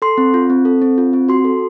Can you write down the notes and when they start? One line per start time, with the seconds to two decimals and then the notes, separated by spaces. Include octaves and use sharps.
0.02 A4 C6
0.18 C4
0.34 F4
0.50 C4
0.65 A4
0.82 C4
0.98 F4
1.13 C4
1.29 F#4 C6
1.45 A4